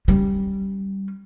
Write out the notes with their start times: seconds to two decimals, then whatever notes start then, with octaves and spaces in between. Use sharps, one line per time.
0.08 G3 C#4